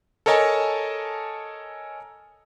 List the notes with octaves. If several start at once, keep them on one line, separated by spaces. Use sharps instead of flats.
A4 A#4 C#5 D#5 G#5 A5